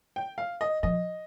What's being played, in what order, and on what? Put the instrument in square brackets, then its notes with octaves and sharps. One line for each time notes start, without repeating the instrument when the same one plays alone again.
[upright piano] G5
F5
D#5
[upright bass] F3 [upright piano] D#5